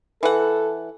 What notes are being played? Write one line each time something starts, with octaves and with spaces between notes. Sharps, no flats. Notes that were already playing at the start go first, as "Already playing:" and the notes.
E3 A4 F#5